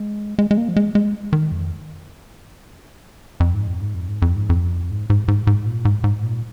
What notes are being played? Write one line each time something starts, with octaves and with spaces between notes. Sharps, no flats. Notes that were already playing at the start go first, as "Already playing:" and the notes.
Already playing: G#3
G#3
G#3
A#3
F3
G#3
G#3
D#3
F2
F2
G#2
F2
G#2
F2
G#2
F2
G#2
F2
G#2
G#2
G#2
G#2
A#2
G#2
G#2
A#2